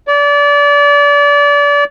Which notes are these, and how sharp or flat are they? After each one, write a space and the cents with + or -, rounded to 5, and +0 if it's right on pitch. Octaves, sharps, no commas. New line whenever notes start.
D5 -30